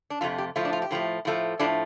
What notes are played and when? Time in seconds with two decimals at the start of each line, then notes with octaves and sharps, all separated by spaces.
0.10 D4
0.21 F2 C3 A3 F4
0.38 G4
0.56 A2 F3 A3 F4
0.65 D4
0.73 F4
0.82 G4
0.91 A2 F3 A3
1.25 A2 F3 A3
1.60 A2 F3 A3 D4